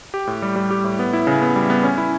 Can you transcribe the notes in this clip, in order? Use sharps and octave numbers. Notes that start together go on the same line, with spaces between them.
G4
A2
G3
G3
G4
A2
B3
E4
C#3
B3
G3
B3
C#4
E4